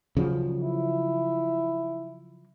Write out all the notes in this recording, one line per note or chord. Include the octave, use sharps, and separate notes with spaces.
C#3 F3 F#3
E4